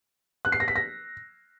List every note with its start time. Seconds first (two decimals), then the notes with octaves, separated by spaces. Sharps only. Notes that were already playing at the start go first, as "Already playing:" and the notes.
0.45 F#6
0.52 C7
0.60 A#6
0.68 B6
0.76 A#6